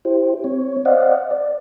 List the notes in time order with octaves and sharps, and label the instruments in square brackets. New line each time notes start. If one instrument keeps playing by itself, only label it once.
[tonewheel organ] E4 G4 C5
C4 C#5
C5 D5 D#5 F5 F#5
D5